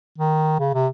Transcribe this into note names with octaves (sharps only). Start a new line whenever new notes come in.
D#3
C#3
C3